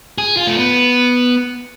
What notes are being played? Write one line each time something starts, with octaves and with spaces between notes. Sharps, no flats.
G#4
F4
A3
B3